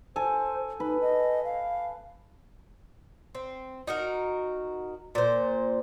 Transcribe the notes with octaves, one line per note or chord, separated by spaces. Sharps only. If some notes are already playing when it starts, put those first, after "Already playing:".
A4 C5 G#5
D#4 B4
D#5
F5
C4
D#4 F#4 A#4
A#2 C5